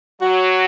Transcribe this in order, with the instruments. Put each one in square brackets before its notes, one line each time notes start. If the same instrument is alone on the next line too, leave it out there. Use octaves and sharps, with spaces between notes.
[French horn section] F#3 [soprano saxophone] F#4